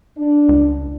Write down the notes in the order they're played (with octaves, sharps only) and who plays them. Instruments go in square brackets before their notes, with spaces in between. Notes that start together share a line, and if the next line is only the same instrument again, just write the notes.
[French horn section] D4
[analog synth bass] C#2